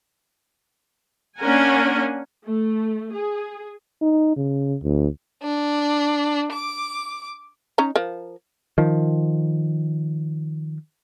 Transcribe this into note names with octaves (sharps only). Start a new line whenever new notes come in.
A#3 C#4 D4 A#4 F#5 G#5
A3
G#4
D#4
C#3
D2
D4
D6
C#4 D#4 A#5
F3 A#4
D#3 F3